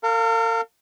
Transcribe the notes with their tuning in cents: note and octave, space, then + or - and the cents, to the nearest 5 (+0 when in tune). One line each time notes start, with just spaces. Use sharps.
A#4 -45 F5 +0